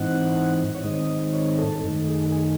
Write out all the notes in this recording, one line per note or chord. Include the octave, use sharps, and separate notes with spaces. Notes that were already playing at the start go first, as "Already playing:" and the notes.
Already playing: G#2 E3 C4 D#4 F#5
C#5
G#2 D#3 G#3 C4 D#4 D#5
C#5
A4
F#2 D#3 A3 D#4
G#4
G#4